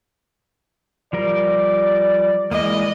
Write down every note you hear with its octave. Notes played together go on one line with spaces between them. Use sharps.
F3 G3 A#4 D5
E3 G#3 A#3 D5 D#5